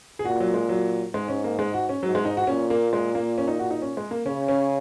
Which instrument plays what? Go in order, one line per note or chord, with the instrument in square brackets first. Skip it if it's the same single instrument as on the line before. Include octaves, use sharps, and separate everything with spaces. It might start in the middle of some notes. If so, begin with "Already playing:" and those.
[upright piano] G#4
[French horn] A#2 [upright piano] F#4
[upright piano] F#3
G#3
F#3
[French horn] G#2 [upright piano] G#3
[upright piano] C#4
A#3
G#3
F#4
C#4
[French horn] G#2 [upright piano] F#3
[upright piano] G#3
D#4
F#4
[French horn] A#2 [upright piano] C#4
[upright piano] A#3
G#3
A#3
C#4
D#4
F#4
D#4
C#4
G#3
A#3
[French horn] C#3 [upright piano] C#4
[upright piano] C#4